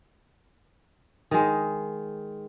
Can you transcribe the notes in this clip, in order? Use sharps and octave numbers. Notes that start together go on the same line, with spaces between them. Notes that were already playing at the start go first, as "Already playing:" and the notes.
D#3 G#3